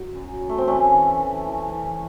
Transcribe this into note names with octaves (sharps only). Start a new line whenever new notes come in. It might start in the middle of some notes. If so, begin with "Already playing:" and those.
Already playing: F#3
F#2
F#2
A3
C4
E3 A3 C#4
E3
E3
E3
E3